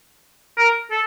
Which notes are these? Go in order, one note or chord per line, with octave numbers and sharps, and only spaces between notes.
A#4
A4